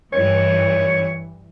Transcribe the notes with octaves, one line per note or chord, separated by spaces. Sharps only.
G2 E3 C#5